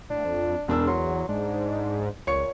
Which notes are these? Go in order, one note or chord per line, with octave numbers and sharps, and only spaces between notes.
A2 D4
F2
E1 E2 D4 E6
F#3 C6
G#2 D4
C#2 A#2 C#5 C#6 C#7